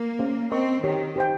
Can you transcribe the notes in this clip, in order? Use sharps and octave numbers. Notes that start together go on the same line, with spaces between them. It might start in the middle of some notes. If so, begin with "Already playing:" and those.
Already playing: A#3
C#4 G#4 C5 F5
C4 A#4 D#5 A#5 C#6
D#3 G4 C#5 G5
G4 C5 G5